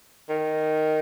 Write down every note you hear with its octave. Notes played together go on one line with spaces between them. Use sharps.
D#3